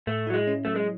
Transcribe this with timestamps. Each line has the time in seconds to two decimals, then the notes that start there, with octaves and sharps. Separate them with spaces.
0.07 A2 A3
0.27 F#3 E4
0.34 G#3
0.47 C#4
0.65 F#3 A3
0.76 G#3